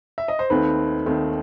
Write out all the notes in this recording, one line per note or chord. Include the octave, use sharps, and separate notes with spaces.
E5
D#5
C5
D#2 D#3 A3 C4 B4
D#2 D#3 A3 C4